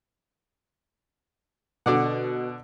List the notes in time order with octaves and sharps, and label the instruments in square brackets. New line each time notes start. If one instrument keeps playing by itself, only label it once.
[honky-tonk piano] B2 [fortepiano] D3 D5 F#5